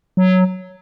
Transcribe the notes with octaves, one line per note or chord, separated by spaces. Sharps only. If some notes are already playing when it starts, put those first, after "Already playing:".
F#3